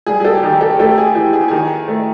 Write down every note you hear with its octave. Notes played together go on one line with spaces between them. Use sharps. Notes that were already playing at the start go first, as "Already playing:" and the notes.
G3 G#4
G#4
G4 A4
G4
D#3 G#4
G4 A4
A3 G4 A4
A4
G#4
E3 G4
G#4
G4
D#3 G#4
A3